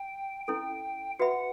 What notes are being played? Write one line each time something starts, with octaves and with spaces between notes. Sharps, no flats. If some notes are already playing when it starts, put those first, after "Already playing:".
Already playing: G5
C#4 E4 A4 G5
F#4 B4 E5 F#5 B5